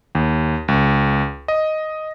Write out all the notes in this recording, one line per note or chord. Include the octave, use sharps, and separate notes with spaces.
D#2
C#2
D#5